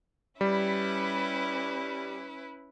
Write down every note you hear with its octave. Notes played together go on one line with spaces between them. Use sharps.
G3 C#4 E4 B4